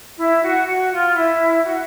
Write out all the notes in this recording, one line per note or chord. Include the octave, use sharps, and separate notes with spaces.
E4
F#4
F#4
F4
E4
F#4